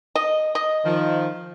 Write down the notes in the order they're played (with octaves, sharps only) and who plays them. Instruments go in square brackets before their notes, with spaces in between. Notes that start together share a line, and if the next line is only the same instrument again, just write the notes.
[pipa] D#5
D#5
[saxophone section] D#3 F3